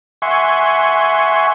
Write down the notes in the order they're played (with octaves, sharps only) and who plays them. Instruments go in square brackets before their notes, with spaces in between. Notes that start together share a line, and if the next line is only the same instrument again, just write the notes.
[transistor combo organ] E5 F#5 G#5 C6 C#6